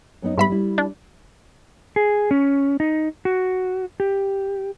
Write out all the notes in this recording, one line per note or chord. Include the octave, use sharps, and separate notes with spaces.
F#2 B3 D#4
G#2 G3 B3 E5 B5
G3 E4
D4
G#4
C#4
D#4
F#4
G4